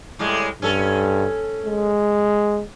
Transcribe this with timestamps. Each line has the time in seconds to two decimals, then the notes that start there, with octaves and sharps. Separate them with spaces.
0.19 A2 G3 G#3
0.62 G2 C#4 A4
1.65 G#3